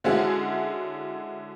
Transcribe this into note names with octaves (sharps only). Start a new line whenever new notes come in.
D3 G#3 C#4 E4 F#4 G#4